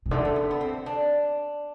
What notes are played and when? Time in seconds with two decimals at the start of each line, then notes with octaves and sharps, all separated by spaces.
0.06 C3
0.11 D3 A3
0.25 A3
0.36 B3
0.51 B3
0.61 C4
0.86 D4